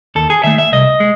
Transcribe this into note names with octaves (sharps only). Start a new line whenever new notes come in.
D#2 A4
G#4
D#3 A3 E5
E5
C2 D#5
G#3